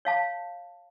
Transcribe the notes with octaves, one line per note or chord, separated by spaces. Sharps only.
C#5 F5 A5